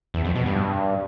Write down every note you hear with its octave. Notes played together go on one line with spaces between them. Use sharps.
E2
F2
B2
G2